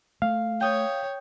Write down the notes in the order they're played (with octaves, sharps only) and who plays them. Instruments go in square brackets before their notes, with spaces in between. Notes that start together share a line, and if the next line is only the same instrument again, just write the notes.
[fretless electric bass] A3 [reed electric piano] F5
[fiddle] C#5 [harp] G5 D#6 G6